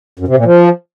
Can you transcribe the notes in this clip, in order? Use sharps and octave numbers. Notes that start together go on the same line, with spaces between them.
F#2
C3
A#2
F3